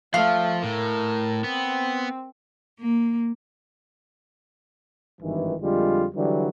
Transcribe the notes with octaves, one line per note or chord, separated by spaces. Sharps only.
F3 A3 F5
A2 A#4
B3 C4
A#3
G#1 G2 D#3 E3
F2 D3 G3 G#3 F4
D3 E3 F#3 G3